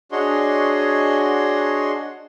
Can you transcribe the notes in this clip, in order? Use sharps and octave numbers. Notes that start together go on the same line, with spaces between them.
D4 F#4 G#4 C#5 D#5 C6